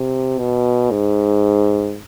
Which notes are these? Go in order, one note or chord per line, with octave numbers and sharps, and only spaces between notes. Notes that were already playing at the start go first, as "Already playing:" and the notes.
Already playing: C3
B2
G#2